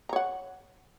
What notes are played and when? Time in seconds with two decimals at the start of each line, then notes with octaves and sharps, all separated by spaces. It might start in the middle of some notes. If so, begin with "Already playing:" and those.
0.09 A#5
0.13 C#5
0.16 F#5